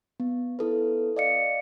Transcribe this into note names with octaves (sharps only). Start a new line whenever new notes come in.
B3
B3 E4 A4 B4
D5 D#5 F5 C#7